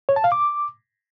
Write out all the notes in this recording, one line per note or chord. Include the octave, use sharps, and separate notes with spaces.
C#5
A5
F5
D6